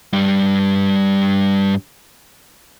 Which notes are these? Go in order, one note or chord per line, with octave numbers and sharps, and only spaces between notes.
G2 G3